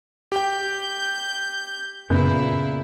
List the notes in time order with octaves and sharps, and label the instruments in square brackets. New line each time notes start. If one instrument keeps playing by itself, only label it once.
[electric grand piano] G4 G5 [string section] G6
[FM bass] F#2 [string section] A#2 E4 [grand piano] C#3 B3 G6